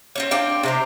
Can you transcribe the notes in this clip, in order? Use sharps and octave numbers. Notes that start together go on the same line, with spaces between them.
C4 C#4 C#5
C4 D4 F5 G5
C3 C5 A#5